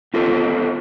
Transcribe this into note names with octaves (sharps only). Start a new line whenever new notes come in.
B3 F4 G4 A4 C5